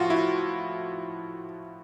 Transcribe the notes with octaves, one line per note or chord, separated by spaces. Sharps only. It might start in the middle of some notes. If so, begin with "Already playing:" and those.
Already playing: A2 F3 F4 F#4
E4